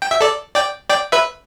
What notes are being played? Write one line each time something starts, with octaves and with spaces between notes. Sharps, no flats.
G5
E5
A4 D5
D5 G5
D5 G5
B4 E5